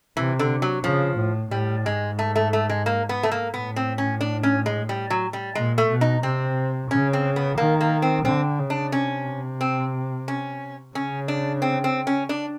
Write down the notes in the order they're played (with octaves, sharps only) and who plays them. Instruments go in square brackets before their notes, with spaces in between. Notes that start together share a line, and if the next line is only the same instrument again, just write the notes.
[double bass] C3 [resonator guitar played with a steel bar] E3
[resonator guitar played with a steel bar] D3
F#3
[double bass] C#3 [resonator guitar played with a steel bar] F3
[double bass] A2
[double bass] A2 [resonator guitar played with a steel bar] G3
[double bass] G#2 [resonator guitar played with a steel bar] G#3
[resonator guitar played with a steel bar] A3
A3
A3
G#3
A#3
B3
A3
A#3
[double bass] A2 [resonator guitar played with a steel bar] B3
[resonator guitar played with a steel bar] C4
C#4
D4
C#4
G#3
G3
F#3
G3
[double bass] A#2 [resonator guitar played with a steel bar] G#3
[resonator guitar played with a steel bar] A3
[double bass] B2
[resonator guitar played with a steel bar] D#4
[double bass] C3 [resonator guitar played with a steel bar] C4
[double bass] C#3 [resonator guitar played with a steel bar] C#4
[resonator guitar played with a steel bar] C4
B3
[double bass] D#3 [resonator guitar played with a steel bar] A#3
[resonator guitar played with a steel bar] A#3
C4
[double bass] D3 [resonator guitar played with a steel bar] C4
[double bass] C#3
[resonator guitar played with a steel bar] D4
[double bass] C3 [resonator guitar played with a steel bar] C#4
[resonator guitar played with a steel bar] C4
C#4
[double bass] C#3 [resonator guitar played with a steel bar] C#4
[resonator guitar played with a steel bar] D4
C4
C4
C#4
D4